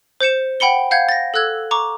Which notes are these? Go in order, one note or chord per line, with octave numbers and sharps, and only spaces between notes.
C5 G6 C#7 E7
F#5 G5 B5 C#7 G7
F5 F#5 G6 G#6
A6 A#6
A4 E6 F#6 G#6
A#5 C#6 D6